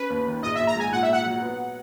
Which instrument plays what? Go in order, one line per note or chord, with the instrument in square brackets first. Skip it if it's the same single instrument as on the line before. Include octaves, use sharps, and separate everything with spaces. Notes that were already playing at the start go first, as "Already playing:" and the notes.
Already playing: [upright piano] C#4 [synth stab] B4
[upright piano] D#2
D#3
[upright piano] A#1 [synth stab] D#5
[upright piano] A#1 [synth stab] E5
[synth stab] A#5
[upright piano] G#2 [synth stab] G#5
[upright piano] A#2 [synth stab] F#5
[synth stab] E5
[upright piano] A#2 [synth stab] F#5
[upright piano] F#3
B3